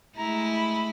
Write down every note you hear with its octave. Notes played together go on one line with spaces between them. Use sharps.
G#3 A3 E4 A#5
B5